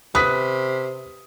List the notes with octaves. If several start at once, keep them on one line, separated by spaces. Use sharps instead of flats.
C3 B4 D#6 B6